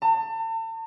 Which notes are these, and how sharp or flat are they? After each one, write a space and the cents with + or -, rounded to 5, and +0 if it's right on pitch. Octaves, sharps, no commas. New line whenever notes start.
A5 +40